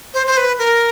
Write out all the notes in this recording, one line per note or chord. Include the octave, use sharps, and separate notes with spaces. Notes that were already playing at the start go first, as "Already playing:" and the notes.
C5
C5
B4
A#4